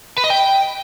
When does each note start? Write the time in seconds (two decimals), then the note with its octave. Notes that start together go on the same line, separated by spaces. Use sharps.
0.18 B4
0.24 D#5
0.30 G5